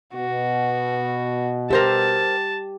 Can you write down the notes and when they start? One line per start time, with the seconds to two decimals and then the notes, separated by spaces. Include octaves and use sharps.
0.14 B2 F#4
1.71 G4 A#4 C5 E5 A5